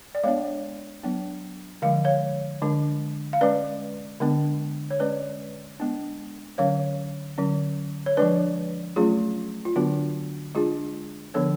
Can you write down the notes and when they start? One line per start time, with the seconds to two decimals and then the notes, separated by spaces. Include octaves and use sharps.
0.15 D5
0.23 G#3 B3 D4 C#5 F5
1.03 F#3 B3 D4
1.82 D3 F3 G#3 F5
2.04 C#5 F5
2.62 D3 G#3 D4
3.33 F5
3.41 G#3 C#4 B4 D5
4.20 D3 G#3 B3 D4
4.90 C#5
5.00 G#3 C#4 B4 D5
5.80 G#3 B3 D4
6.58 D3 F#3 C#4 C#5 F5
7.38 D3 F#3 C#4
8.06 C#5
8.17 F3 G#3 D4 B4 D5
8.96 F#3 A3 C#4 F4 G#4
9.65 F4
9.76 D3 F#3 B3 D4 F#4
10.55 G#3 D4 F4 G#4
11.34 D3 F3 B3 D4 A4 C#5